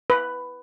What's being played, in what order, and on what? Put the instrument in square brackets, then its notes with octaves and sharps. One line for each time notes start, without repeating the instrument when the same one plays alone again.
[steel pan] B4